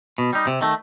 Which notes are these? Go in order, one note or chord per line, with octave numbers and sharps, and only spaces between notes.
B2
G3 D#4
C3
D#3 A3